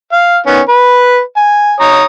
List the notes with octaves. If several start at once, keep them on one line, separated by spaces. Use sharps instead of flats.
F5
D#3 B3 C#4
B4
G#5
C#5 A#5 D#6